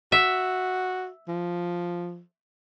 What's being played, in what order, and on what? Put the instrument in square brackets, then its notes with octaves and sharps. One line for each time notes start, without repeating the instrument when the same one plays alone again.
[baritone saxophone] F#4 [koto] E5
[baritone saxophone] F3